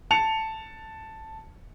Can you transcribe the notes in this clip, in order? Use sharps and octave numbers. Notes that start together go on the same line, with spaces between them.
A5 C#7 F7